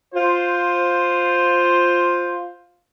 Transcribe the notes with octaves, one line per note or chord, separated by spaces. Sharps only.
F4 C5